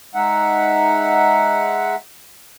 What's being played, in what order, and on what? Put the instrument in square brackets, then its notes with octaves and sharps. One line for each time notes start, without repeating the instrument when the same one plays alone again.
[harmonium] G#3 D#4 E5 F#5